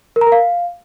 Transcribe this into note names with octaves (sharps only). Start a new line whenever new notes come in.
A#4
A#5
A#4
F5